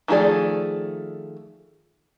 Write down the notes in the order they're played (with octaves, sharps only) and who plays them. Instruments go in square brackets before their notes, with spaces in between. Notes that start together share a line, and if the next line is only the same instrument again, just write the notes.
[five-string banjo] D#3 F3 A3 G#4 D5